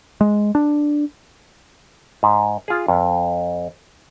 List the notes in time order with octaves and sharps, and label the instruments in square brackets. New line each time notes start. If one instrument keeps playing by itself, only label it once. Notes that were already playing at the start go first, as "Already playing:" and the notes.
[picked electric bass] G#3
D4
[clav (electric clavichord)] G#2
F4 G#4
F2